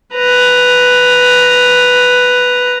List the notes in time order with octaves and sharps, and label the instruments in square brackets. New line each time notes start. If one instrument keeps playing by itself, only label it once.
[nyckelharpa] B4 A#5